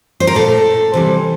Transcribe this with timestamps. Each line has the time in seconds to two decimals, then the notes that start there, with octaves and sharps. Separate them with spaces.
0.20 C5
0.27 A#4
0.35 A#2 A3 A4
0.93 C3 E3 G3